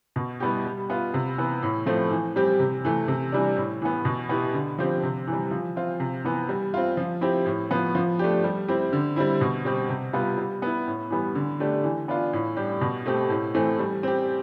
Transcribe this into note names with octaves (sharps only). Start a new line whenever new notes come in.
B2
G3 B3 E4 G4
G3
B3 F4
C3
E3 B3
A2
F3 A3 C4
E3
G3 C4 G4
C3
E3 A3
C3
E3 G3 D4
A2
E3 B3
B2
B3 E4 G4
D3
F3 C4 G4
C3
E3 G3
F3
C4 F4
C3
E3 B3
G3
C4 F4
F3
C4 E4 G4
A2
F3 B3
F3
A3 D4 G4
G3
C4 E4 G4
D3
G3 C4 E4
B2
G3 C4 G4
C3
G3 B3 F4
G3
B3 E4
A2
E3 G3 B3
D3
A3 D4 G4
E3
B3 D4 F4
A2
G3 D4 G4
B2
A3 C4 G4
A2
E3 A3 C4
G3
C4 G4